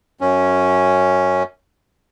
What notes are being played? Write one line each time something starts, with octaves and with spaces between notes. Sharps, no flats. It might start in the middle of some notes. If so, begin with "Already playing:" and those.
F#2 C#4